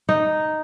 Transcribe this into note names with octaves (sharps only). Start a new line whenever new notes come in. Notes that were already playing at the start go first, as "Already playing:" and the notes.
D#4